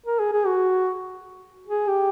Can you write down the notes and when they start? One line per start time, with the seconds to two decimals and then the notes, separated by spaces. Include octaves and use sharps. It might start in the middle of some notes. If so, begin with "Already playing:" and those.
0.06 A#4
0.20 G#4
0.33 G#4
0.46 F#4
1.67 G#4
1.88 G4